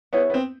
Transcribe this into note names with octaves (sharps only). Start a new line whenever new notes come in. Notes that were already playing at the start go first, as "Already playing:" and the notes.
B3 E4 G#4 C#5 F#5
B3
C4